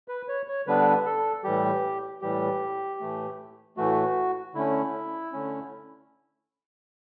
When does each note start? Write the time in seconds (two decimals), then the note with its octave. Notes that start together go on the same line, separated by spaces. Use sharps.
0.08 B4
0.28 C#5
0.48 C#5
0.67 D3 G3 B3 D4 B4
1.05 A4
1.44 A2 E3 G3 G4
2.21 A2 E3 G3 G4
3.00 A2 E3 A3
3.77 A2 E3 A3 F#4
4.55 D3 A3 C#4 E4
5.32 D3 A3 C#4